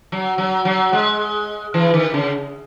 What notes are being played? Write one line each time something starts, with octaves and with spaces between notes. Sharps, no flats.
F#3
F#3
F#3
G#3
E3
D#3
C#3